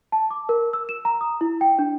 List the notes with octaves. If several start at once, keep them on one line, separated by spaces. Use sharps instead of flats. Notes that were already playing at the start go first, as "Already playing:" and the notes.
A5
D6
A#4
E6
E7
A#5
D#6
E4
G5
D4